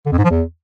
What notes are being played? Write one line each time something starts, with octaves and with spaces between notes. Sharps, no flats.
D3
F2
G#2
F3
E2